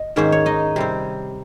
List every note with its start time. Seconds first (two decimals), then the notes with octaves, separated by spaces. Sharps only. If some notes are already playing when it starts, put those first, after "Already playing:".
Already playing: D#5
0.16 G#2 D#3 A#3 C#4 C5
0.32 C#5
0.46 D#4 D#5
0.76 C3 G3 C4